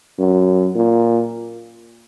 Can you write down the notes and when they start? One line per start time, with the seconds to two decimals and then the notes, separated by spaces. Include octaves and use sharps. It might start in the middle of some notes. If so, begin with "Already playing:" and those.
0.19 F#2
0.75 A#2